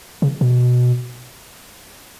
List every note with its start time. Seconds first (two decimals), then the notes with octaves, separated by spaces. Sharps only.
0.22 C#3
0.41 B2